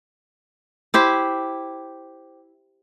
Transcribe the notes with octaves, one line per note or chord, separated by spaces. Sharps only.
E4 G4 C5